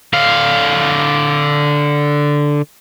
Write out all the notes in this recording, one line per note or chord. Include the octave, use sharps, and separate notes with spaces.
D3 F5